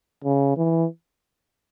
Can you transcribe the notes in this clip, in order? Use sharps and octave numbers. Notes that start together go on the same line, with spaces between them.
C#3
E3